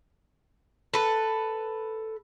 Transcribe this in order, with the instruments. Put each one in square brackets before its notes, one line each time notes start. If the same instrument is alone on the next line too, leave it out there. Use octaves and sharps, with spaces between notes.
[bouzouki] A4 B4